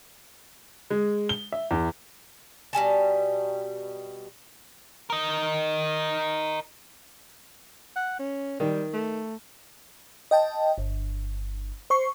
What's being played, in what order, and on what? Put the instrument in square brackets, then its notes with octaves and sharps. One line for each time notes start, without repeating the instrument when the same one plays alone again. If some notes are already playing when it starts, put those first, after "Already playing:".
[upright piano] G#3
G7
E5
E2
[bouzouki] B2 G3 G#5 A5
[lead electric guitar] A#4 D#5
[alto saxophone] F#5
C#4
[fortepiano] D#3 [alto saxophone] G3
[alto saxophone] A3
[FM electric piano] D#5 G5 A5
G1
C5 C#6 C7